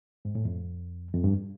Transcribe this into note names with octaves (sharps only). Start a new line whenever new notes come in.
G#2
A2
F2
F2
G2